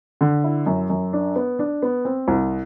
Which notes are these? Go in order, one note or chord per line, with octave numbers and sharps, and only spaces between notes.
D3
E4
F#2
F#2
D4
B3
D4
B3
C4
C2